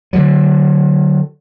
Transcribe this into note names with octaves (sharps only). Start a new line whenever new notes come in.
D3 F#3